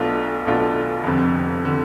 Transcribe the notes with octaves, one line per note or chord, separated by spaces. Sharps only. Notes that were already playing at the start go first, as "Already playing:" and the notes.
Already playing: B1 B2 A3 D4 F4
B1 B2 A3 D4 F4
F1 F2 D3
D3